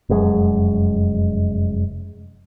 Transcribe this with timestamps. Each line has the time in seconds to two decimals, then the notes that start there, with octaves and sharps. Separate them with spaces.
0.09 F1 F#2 G#3